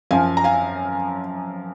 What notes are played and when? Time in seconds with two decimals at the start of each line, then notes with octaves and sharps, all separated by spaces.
0.11 F#2 F3 F5 G#5
0.37 A#5
0.44 F5 G#5